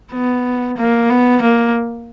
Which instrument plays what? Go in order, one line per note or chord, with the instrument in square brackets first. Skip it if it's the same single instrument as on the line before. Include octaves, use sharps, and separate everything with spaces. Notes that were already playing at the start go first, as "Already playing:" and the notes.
[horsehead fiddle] B3
A#3
B3
A#3